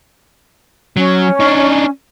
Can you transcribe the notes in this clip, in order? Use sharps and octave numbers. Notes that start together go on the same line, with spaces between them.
F#3 C#4
D4 D#4